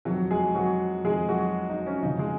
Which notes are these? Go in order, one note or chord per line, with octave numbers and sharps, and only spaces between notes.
F2 D#3 F#3 F#4
G#3 G#4
F#3 F#4
F2 D#3 G#3 G#4
F#3 F#4
D#4
C#4
F2 C#3 D#4
G#3 G#4